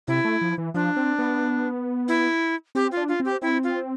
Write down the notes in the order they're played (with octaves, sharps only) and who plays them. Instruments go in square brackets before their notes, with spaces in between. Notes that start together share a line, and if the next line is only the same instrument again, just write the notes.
[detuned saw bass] C3 [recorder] E4
[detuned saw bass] A3
F3
E3
[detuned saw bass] F3 [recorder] D4
[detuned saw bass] C4
B3
[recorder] E4
[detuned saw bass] C4 [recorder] G4
[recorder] F4
[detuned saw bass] D4
[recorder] F4
[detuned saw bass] C4
[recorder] G4
[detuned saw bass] C4 [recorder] E4
[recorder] F4